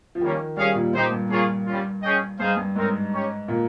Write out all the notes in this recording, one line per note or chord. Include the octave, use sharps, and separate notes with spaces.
F3
D#3 G3 A#3 C#4
G3 C#4 G#4 C#5 F5
A#2
A#2 D#4 G4 C5
G2
G2 A#3 F4 G#4 C#5
G3 C#4 F4
C#4 G#4 D#5 G5
G2 D#4 G#4 C5 F5
G2
G#2 C4 D#4 A#4 C#5
C#4 G4 C#5
A#2